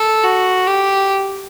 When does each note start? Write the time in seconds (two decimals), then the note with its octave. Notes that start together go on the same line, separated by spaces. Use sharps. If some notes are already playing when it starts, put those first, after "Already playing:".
Already playing: A4
0.24 F#4
0.67 G4